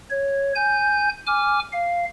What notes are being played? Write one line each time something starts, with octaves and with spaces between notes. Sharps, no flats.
C#5
G#5 G6
G#5 D6 F6
F5